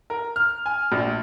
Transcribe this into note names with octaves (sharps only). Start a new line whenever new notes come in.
A#4
F6
G#5
A#1